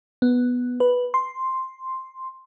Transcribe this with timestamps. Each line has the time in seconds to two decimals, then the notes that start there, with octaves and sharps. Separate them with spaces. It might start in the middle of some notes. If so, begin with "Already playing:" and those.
0.22 B3
0.80 B4
1.14 C6